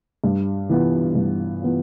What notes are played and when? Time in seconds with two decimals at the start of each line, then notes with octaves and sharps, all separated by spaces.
0.24 G2
0.69 E3 B3 F4
1.15 G2
1.62 E3 B3 F4